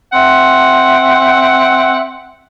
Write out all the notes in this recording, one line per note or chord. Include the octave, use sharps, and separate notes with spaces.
C4 E5 F#5